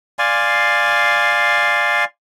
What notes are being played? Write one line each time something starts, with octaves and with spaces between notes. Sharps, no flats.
D5 F5 G#5 C6